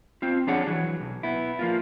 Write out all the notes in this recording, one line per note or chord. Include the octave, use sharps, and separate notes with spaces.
C4 F4
F3 D4 G#4 C#5 F#5
E3 F#3
B1
B3 E4
F3 A#3 F4